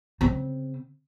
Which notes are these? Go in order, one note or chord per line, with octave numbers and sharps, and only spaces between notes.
C#3 C4